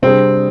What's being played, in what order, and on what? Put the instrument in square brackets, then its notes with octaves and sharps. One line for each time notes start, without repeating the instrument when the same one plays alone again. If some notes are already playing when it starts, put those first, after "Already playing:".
[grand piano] C3 G3 D4 G#4 [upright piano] C4